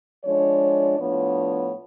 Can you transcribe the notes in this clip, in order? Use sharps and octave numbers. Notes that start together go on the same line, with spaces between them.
F3 G#3 D4 C#5
A2 F3 B3 D4 C#5